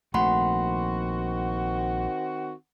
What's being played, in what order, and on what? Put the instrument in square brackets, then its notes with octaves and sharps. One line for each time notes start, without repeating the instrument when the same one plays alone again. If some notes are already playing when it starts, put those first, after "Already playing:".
[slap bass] A#1 A3 [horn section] D#3 C4 F#4 [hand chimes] F#5 B5 C6